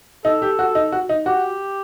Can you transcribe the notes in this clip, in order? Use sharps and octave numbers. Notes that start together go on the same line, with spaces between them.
D#4 A4
G4
F#4
D#4
F#4
D#4
F#4 G4